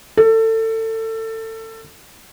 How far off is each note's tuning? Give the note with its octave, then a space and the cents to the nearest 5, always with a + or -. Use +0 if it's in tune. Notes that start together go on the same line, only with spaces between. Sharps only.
A4 +25